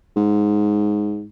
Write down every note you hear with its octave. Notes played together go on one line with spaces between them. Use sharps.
G#2